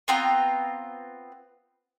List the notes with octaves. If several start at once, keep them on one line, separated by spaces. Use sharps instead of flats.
B3 C4 F4 A#5